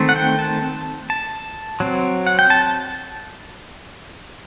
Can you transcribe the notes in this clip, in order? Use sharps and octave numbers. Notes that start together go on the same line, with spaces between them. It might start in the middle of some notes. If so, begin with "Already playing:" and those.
Already playing: D#3 A3 C4
F#5
G5
A5
A5
F#3 C4
F#5
G5
A5